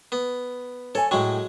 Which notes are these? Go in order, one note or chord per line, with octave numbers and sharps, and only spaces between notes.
B3
A4 C#5 G#5
A2 F#3 G#3 G5